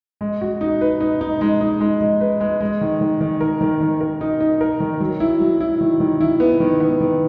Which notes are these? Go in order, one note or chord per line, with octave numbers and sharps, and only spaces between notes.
G#3
F#4
D#4
B4
D#4
D#4
G#3
D#4
G#3
G#3
B4
G#3
G#3
D#3
D#3
D#3
A#4
D#3
D#3
A#4
D#4
D#4
A#4
D#3
F#3
E4
F#3
E4
D#3
D#3
E4
B3
D#3
B3
D#3